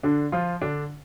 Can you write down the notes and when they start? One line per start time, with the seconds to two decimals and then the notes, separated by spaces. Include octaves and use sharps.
0.03 D3 D4
0.32 F3 F4
0.62 D3 D4